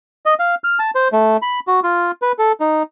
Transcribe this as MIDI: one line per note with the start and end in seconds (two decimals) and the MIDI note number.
0.26 0.34 75
0.39 0.55 77
0.64 0.79 89
0.79 0.91 81
0.95 1.08 72
1.13 1.37 57
1.42 1.60 83
1.67 1.80 66
1.83 2.11 65
2.22 2.32 71
2.39 2.52 69
2.60 2.83 63